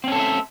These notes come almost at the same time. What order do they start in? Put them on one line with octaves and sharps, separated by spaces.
C4 C#4 A4 C5 E5